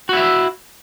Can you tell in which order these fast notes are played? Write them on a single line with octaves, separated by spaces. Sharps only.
F#4 E4 E5